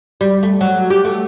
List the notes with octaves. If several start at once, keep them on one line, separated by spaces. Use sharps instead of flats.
G3
A3
F#3
G4
A3